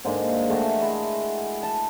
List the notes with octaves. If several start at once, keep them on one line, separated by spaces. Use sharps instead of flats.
G#2 D3 G#3 A#3
G#3 A3 F#4
E4 G#4
A5